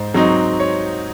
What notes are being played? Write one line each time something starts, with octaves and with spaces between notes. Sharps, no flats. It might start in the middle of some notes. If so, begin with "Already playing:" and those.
Already playing: G#2 C5
F#3 C4 D#4
C#5